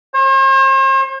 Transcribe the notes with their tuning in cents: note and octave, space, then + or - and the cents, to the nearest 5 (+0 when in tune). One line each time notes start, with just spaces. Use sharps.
C5 +45